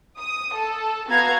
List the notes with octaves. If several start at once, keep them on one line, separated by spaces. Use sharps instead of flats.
D#6
A4
B3 F#4 F5 A#5 G#6